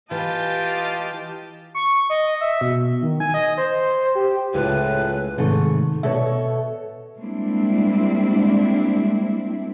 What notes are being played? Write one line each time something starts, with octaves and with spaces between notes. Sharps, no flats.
E3 F4 G4 D#5 G5 A5
C#6
D#5
E5
B2
D#3
G#5
D#5
C5
G4
C#2 A2 F4 B4 A5
G#2 C3 D#3 A3
B2 A4 C#5 E5
G3 G#3 A#3 C4 D4 E4